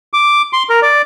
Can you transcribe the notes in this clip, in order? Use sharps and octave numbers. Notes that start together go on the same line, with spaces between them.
D6
C6
A#4
D5